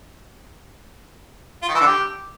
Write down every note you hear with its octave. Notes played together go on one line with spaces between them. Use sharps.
F4
D#3
E3
D3
G4